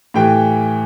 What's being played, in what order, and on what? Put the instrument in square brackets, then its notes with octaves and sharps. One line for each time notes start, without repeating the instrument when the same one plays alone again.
[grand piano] A2 E3 G4 G5